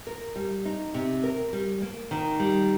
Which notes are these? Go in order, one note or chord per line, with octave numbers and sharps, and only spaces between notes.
A#4
G3
D#4
C3
A#4
G3
A#3
D#3
G3